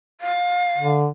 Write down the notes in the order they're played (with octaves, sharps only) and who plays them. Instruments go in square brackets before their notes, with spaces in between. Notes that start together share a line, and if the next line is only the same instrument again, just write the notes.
[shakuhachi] F5
[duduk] D3